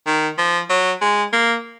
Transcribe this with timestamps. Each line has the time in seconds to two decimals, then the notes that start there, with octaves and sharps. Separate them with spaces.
0.07 D#3
0.38 F3
0.70 F#3
1.01 G#3
1.33 A#3